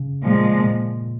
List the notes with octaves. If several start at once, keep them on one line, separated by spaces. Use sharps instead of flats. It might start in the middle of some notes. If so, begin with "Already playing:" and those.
Already playing: C#3
A#2 F3 G#3
A#2